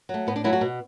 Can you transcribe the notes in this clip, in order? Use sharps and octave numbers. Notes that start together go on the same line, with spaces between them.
F#3 A3
A2 B3
D4
F#3 A3 E4
F#4
B2